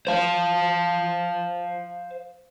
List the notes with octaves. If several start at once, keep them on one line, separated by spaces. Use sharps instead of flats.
C5 F5